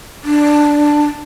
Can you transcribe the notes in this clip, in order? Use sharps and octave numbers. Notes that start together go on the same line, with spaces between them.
D4